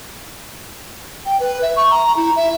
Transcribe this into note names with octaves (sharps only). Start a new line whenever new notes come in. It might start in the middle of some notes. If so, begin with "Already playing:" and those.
G5
B4
E5
C#6
A#5
E4
E5